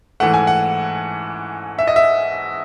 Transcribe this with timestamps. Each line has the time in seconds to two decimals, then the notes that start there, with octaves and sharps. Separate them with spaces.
0.20 G#2 E3 A3 F#5
0.34 G#5
0.47 F#5
1.79 E5
1.87 D#5
1.96 E5